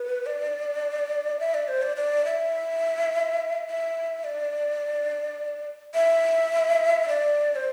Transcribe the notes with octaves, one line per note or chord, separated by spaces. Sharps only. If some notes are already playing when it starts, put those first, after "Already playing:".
Already playing: B4
D5
E5
D5
C5
D5
D5
E5
E5
D5
E5
D5
C5